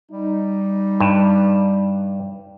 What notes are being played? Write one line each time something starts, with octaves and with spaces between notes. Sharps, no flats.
G3 D#4
G2